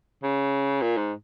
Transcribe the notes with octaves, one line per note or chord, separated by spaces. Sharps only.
C#3
A#2
G#2